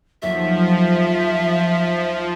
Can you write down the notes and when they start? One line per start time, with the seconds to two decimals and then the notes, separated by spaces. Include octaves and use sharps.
0.22 D#2 F3 F#3 A4 E5